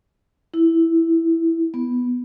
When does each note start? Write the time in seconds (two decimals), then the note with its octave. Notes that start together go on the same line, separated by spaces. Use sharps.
0.54 E4
1.74 B3